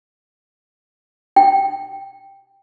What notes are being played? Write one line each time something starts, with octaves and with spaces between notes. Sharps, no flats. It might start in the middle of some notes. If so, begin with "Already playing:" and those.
G5